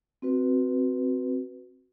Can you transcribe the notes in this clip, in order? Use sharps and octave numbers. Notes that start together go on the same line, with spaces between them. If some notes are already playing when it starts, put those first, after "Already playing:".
C4 F#4 B4